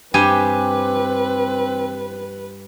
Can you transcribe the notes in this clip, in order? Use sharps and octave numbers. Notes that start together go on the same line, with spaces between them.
G2 C4 G4 B4 G#5